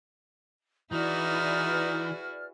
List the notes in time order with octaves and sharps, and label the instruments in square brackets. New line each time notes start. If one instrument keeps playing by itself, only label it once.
[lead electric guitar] E3 [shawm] D#4 [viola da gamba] E4 F#4 G#4 [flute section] B4 D5 F6